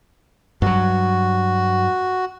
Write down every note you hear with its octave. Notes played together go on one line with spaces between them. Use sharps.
G2 F#3 F#4